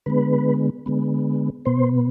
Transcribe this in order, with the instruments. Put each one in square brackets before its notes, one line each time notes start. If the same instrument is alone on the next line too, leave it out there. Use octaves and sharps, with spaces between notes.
[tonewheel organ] D3 G#3 B3 B4
D3 G#3 B3
B2 B3 C5